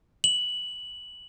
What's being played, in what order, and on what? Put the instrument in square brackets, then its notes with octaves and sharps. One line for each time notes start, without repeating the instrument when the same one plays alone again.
[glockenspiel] F#7